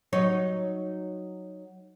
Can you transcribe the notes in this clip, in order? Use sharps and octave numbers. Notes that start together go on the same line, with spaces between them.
F#3 D#4 C#5